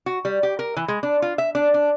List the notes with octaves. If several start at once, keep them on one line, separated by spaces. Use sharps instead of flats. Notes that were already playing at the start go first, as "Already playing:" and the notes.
F#4
G3
G4
A#4
E3
G#3
D4
F4
E5
D4
D4